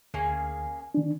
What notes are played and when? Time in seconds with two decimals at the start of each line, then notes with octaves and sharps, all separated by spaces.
0.14 D2 A#3 C#4 G#4
0.94 D#3 D4